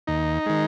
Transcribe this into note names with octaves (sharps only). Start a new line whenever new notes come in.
D#2 D#4
D#3 G#3